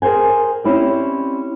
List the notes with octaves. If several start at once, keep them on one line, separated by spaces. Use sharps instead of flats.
G#4 A#4 C5 G5 G#5
C4 C#4 E4 G4 D5